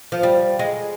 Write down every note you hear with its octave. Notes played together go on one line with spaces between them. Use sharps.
F3
G3
G#3